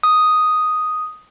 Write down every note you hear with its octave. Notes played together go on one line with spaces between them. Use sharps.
D#6